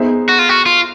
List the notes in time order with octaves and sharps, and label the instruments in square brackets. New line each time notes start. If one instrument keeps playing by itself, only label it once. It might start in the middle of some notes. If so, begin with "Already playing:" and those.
Already playing: [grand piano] B3 D#4 G#4 C5 E5
[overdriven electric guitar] F#4
F4
F#4
F4